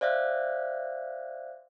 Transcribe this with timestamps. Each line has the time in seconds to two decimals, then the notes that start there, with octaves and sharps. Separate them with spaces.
0.01 C5 D5 E5 F5 F#6